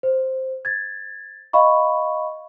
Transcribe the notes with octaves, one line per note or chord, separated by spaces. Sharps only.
C5
G#6 A6
D#5 F5 B5 C#6